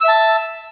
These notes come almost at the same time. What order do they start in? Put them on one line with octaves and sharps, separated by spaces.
E6 E5 A5